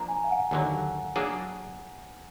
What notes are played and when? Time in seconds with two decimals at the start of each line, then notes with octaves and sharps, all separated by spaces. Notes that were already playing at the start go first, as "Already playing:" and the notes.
Already playing: F3 A#3 D4 A#5
0.08 G#5
0.24 F5
0.31 F#5
0.51 D#2 D3 F#3
1.16 F#3 A#3 D4 G#4